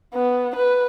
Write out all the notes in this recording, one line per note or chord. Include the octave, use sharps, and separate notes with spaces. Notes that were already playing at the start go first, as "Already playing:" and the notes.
B3
B4